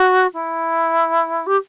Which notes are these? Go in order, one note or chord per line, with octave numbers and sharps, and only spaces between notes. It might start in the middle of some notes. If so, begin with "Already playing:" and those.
Already playing: F#4
E4
G4